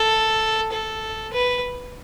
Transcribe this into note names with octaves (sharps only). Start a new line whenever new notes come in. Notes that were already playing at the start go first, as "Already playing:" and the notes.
Already playing: A4
A4
B4